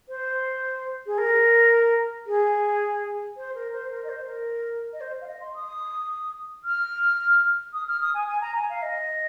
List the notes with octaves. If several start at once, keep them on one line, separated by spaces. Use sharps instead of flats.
C5
G#4
A#4
G#4
C5
A#4
C5
A#4
D#5
C5
A#4
D#5
C5
F5
D#5
C6
D#6
F6
D#6
F6
D#6
G#5
G#5
A#5
G#5
F5
D#5